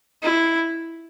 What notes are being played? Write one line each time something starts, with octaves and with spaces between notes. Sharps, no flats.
E4